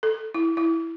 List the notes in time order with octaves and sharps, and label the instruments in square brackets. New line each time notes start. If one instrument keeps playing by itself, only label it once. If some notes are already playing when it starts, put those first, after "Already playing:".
[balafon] A4
E4
E4